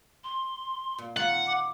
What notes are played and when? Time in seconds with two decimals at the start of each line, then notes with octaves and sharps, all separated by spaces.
0.24 C6
0.98 A#2
1.17 D#3 A#3 F4 F#5
1.46 D6